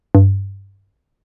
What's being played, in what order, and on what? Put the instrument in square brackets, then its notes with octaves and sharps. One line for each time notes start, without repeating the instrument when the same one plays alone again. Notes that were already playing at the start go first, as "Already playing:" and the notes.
[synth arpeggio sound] G2